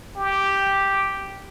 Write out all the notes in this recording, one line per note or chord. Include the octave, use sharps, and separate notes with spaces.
G4